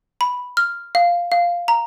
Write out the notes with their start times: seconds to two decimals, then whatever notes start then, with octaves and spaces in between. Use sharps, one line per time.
0.21 B5
0.57 F6
0.95 F5
1.32 F5
1.68 A#5